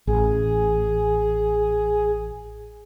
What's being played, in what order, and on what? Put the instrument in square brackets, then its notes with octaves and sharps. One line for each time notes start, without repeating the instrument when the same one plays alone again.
[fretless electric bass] A1 [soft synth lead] G#4